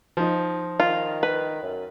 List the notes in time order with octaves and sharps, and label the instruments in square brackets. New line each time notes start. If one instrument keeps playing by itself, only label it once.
[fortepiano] F3 D#4
[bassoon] D#3 [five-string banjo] F4
[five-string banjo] B4
[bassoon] F#2